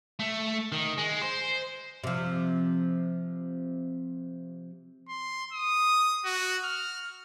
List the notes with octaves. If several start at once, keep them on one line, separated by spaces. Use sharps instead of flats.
A3
D#3
G#3
C5
C3 F3
C6
D#6
F#4
F6